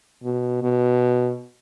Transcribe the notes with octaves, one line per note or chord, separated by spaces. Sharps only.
B2
B2